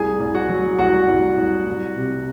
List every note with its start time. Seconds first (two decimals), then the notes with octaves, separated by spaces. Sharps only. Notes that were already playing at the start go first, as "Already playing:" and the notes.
Already playing: C2 G#4 G#5
0.20 C2
0.35 F#4 F#5
0.49 F#3
0.78 C2 F#4 F#5
1.08 C2
1.37 C2
1.66 C2
1.96 C3